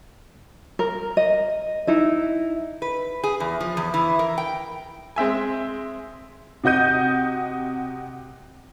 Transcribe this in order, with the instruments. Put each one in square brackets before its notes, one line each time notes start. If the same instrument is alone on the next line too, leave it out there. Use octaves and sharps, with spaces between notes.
[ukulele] A#4
D#5
D#4 E4 D#5
[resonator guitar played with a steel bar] B4
G#4
E2
F3
E2
E3
A#4
G5
[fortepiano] G#3 C4 E5 G#5
[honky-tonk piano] C3 F#4 D#5 G6 D#7